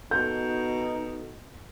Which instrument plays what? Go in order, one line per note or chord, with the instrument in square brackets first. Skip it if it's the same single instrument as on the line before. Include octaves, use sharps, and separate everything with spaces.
[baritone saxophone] B2 [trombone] D#4 [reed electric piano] A4 [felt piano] G6